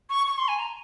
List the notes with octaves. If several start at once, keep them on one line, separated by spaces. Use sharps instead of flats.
C#6
C#6
C6
G#5
A#5